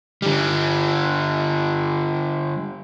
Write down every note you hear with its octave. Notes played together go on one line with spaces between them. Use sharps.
D3 G3